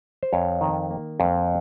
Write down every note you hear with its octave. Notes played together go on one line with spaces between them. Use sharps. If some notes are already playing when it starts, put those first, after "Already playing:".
C5
F2 C#5
D#3
A#3
F2